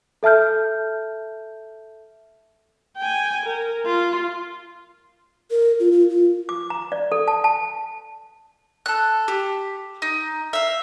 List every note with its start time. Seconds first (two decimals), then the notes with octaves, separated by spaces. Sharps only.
0.23 A4 E5 A5 F6 G6
2.97 G5 G#5
3.46 A#4
3.86 F4
5.51 A#4
5.80 F4
5.92 F4
6.10 F4
6.49 D6
6.70 A#5
6.92 D5
7.12 A4
7.28 A5
7.44 A5
8.86 A4 F#6
9.28 G4
10.02 D#4
10.53 E5 F5